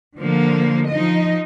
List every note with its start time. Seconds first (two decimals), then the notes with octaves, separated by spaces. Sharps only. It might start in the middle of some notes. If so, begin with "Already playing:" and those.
0.18 D3 F3 A#3
0.91 F3 D#4 D#5